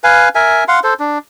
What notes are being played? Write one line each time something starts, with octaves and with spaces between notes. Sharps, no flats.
B4 F5 G#5
A#4 E5 G#5
F5 F#5 C6
A4 C5
D4